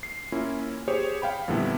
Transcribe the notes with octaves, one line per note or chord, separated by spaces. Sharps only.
C7
A#3 C#4 E4 F4
G4 G#4 C5 C#5
F5 G5 B5
F2 A#2 D3 G3 B3 E4